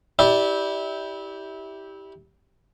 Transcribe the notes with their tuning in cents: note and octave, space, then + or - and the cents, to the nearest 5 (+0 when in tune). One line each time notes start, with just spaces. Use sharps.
E4 -20 G4 +0 D5 +0